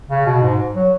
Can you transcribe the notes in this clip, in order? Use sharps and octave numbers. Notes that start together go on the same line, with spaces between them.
C#3
B2
G#2
F#3